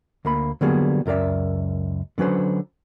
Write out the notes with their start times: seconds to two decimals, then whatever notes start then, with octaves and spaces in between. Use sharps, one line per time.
0.25 D2 A#3 B5
0.61 D3 F#3 G3 A#3 B3 G#4
1.06 C#2 F#2 A#4 D5 E5
2.18 D3 F#3 C#4 B4 C5